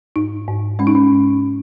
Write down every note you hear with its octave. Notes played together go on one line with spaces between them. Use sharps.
G#2 D#4
G#2
G#3 C#4
D#4
C#4
G#2